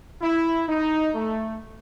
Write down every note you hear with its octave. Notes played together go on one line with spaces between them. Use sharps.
E4
D#4
A3